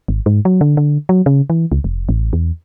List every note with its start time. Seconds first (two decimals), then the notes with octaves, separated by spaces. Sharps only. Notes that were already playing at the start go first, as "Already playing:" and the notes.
0.08 G#1
0.26 G#2
0.45 F#3
0.61 D3
0.77 D3
1.09 F#3
1.26 C#3
1.50 E3
1.72 C#2
1.84 F1
2.09 A1
2.33 E2